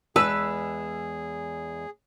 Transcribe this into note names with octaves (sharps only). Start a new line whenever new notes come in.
E2 G#3 G#4 B4 A5 E6